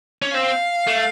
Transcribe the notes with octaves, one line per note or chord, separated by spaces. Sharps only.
C#4
C4 F5
A3